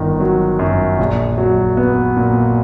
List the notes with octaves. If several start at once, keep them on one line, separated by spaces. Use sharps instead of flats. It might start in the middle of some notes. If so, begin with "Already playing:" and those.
Already playing: G1 D#3
F#3
F#2
A#1
F#3
B3
A#2